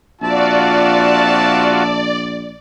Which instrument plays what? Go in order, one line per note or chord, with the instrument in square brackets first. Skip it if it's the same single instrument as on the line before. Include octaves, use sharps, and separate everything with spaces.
[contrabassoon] A#1 [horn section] C4 E5 A5 [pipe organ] F4 F#4 [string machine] D5